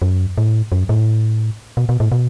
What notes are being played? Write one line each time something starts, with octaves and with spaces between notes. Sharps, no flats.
F#2
A2
F#2
A2
B2
B2
A2
B2